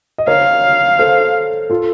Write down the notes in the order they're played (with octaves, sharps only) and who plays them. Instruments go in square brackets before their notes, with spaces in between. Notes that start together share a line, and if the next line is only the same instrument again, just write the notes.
[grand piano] D#5
[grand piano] A#4 C#5 [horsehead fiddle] F5
[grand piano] A4 C5
F4 A4